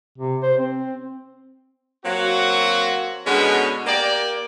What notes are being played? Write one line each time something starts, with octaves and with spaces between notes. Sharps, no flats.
C3
C5
C4
F#3 A#3 C4 F#4
B2 D3 G#3 B3 C#4
A#3 G4 A#4 D5